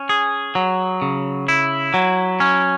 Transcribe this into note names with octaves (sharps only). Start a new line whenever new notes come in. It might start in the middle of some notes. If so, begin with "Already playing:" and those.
Already playing: C#4
G#4
F#3
C#3
E4
F#3
C#4